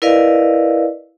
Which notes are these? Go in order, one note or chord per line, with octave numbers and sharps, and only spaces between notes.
E4 A#4 B4 D5 D#5 F5